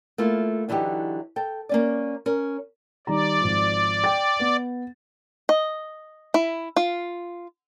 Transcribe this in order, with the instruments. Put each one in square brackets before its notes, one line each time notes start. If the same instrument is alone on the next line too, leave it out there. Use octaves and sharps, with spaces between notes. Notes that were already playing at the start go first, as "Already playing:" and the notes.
[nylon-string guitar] A3 A#3 E4 F4
D3 E3 F#3 D#4 G4
A4 G5
A#3 C#4 D5
C#4 A#4
[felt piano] D#3 G3 A#5 [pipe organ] D5
[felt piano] G#1 F3
G5 A6
B3
[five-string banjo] D#5
E4
F4